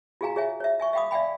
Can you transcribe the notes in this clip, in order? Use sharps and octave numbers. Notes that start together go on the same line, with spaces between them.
F4 F#4 G#4 F5 G#5 A#5
G#4 C#5 E5 G#5
C#5 E5
E5 G#5 C#6
E5 F5 G5 B5 D6 D#6
D5 E5 F5 G5 G#5 B5